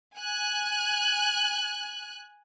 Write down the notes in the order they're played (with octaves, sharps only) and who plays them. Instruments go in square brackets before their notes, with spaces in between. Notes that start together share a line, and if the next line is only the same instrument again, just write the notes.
[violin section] G#5 F#6